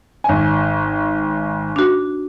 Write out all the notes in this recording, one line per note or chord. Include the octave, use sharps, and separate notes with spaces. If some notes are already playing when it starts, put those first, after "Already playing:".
G#1 G#5
D4 F#4